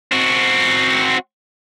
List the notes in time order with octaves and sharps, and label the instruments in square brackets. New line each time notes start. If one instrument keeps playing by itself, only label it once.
[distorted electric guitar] C4 F#4